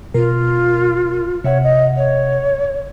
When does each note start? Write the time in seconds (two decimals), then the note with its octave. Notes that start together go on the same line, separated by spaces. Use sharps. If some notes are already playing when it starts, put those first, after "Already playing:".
0.14 B2 F4 A#4
1.44 C3 C#5 E5 F#5
1.63 D#5
1.96 C#5